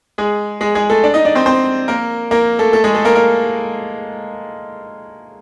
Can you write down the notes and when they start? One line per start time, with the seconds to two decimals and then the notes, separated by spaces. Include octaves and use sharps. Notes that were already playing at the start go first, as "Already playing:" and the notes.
0.18 G#3 G#4
0.61 G#3 G#4
0.75 G#3 G#4
0.90 A3 A4
1.04 D4 D5
1.14 D#4 D#5
1.25 D4 D5
1.35 C4 C5
1.46 C4 C5
1.88 A#3 A#4
2.31 A#3 A#4
2.59 A3 A4
2.73 A3 A4
2.84 G#3 G#4
2.94 A3 A4
3.05 A#3 A#4
3.15 A#3 A#4